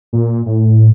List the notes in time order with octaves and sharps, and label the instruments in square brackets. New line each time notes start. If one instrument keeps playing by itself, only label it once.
[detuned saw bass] A#2
A2